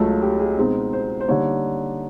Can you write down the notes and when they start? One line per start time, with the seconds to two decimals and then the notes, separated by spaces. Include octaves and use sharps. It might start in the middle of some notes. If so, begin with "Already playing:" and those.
Already playing: C#2 C#3 F#3 A3 C#4 A4
0.22 G4
0.39 G#4
0.57 B2 G#3 C4 D#4
0.93 C5
1.21 C5
1.28 D3 G3 A#3 D#4 C#5